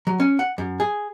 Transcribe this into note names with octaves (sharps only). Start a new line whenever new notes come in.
F#3
C#4
F#5
F#2
G#4